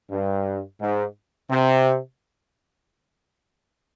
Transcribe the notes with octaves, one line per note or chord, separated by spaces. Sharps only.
G2
G#2
C3